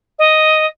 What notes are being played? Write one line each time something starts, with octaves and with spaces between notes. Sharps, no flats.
D#5